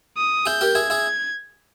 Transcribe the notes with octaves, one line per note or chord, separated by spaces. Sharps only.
D#6
E4 G#4 G6
G4 A#4
E4 G#4 G#6
E4 G#4